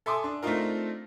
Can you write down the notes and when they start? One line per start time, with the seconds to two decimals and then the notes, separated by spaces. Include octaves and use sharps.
0.06 A4 E5 G#5 C6 D6 D#6
0.24 D4
0.42 A3 C4 D4 D#4 F4 A#4